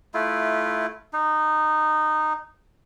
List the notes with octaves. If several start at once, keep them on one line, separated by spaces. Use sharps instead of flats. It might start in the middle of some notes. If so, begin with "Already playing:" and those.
A3 E4 F4
D#4